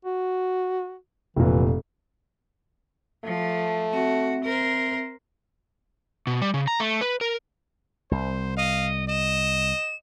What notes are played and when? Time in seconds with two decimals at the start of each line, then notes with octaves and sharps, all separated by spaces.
0.05 F#4
1.37 F1 A#2 E3
3.24 F3 A3
3.93 C4 F#4 E5
4.44 A#4 C5
6.27 B2
6.41 G3
6.54 C#3
6.67 A#5
6.80 A3
7.01 B4
7.21 A#4
8.11 C2 C5
8.57 D#5 F5
9.09 D#5 E7